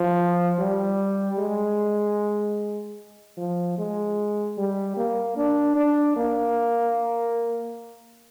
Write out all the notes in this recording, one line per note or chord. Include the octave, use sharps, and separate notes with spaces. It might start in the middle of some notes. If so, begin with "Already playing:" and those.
Already playing: F3
G3
G#3
F3
G#3
G3
A#3
D4
D4
A#3